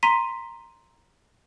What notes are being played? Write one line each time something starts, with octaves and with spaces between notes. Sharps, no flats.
A#5 C6 B6 D#7